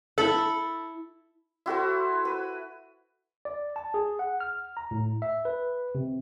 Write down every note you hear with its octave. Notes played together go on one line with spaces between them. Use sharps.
E4 A4 B5
E4 F#4 A4 C5
B4
D5
A5
G#4
F#5
F6
A#5
A2
E5
B4
C3